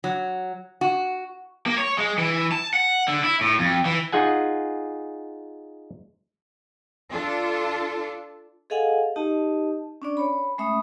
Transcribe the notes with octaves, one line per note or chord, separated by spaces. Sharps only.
F#3
F#4
A#3
C#5
G#3
E3
A5
F#5
D3
E4
A2
F2
E3
D#4 F4 G#4 F#5 G#5
D4 F4 A4
G#4 A4 D#5 F5 F#5 G#5
D#4 G4 D#5 A5
C#4 D4 D5
C#5 B5
G#3 A3 C#4 E5 B5 D#6